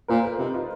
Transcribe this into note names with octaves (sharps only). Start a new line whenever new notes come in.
A#2 A#4 C5
A4 B4
C3 D#4 F4
D#4 F4